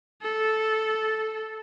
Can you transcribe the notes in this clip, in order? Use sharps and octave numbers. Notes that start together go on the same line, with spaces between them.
A4